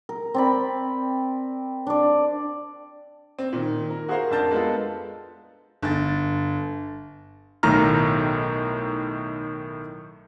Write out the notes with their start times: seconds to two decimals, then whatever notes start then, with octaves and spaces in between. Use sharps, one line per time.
0.09 A#4
0.34 C4 D5 B5
1.87 D4 D5
3.39 C4
3.53 A#2 D#3
3.90 A#4
4.08 F#4 G#4 A#4 C5 F5
4.31 F2 D4 A#4 A5 G6 A6
4.51 G#3 B3 F4 A4
5.82 G1 A6
7.63 B1 A2 D#3 A#5 F6